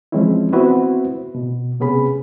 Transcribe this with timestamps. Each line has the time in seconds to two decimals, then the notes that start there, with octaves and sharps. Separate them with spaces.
0.12 E3 F3 G#3 C4 C#4 E4
0.53 B3 C4 E4 F#4 B4 C5
1.35 B2
1.80 C3 B3 C#4 G#4 B5